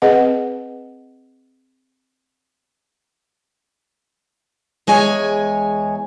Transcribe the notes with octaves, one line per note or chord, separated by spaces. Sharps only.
C4 G#4 B4 D#5 F#5
E2 G#3 C#5 G#5